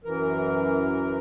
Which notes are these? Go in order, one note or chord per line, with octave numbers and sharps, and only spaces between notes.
F#2 E3 A#4